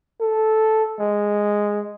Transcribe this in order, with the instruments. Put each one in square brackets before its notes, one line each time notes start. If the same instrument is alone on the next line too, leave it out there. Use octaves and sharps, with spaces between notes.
[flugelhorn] A4
G#3